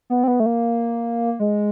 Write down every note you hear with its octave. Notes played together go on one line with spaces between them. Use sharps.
B3
C4
B3
A3
A#3
G#3